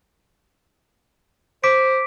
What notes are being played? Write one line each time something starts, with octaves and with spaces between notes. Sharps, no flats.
C5 D6 B6 D7